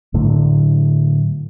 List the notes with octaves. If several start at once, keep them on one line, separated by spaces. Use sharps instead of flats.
A2 D3 F#3 A3